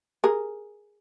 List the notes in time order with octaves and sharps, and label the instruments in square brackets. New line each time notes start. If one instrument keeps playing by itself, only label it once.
[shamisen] G#4 A#4